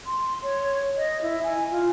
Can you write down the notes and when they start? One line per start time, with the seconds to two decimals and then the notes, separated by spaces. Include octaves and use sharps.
0.06 C6
0.44 C#5
0.97 D#5
1.22 E4
1.43 G#5
1.71 F4